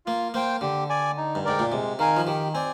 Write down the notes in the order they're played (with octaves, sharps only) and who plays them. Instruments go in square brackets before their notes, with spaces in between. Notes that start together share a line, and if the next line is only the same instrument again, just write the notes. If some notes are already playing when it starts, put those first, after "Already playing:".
[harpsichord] A#3 [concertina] F4
[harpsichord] A#3 [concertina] C5 G5
[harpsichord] D3 [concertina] G4
[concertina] D5 G#5
D#4
[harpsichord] G2
[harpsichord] G#2 [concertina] A#4 D5 G5
[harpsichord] A#2
[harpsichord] C3 [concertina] G#3
[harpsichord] D#3 [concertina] D#4 A#4 F5 G#5
[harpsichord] F3
[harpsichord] D#3 [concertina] G4
[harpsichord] C4 [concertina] D5 G#5